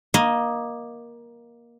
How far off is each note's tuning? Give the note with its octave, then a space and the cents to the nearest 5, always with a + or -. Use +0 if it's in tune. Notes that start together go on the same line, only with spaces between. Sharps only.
A#3 +15 D#5 +0